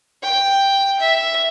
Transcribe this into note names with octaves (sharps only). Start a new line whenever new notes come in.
G5
E5